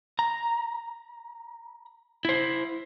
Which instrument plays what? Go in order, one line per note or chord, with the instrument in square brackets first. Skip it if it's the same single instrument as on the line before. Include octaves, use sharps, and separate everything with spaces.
[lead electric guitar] A#5
E4 C5